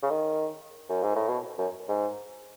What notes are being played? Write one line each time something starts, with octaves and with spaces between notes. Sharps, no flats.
C#3
D#3
F#2
G#2
A2
B2
F#2
G#2